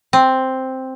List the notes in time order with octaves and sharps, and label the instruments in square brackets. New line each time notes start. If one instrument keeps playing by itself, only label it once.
[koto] C4